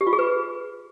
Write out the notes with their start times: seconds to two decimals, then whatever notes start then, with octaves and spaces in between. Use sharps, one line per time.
0.01 G4
0.07 F4
0.13 G#4
0.19 B4